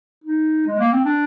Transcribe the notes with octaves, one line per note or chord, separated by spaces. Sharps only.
D#4
G#3
A#3
C4
D4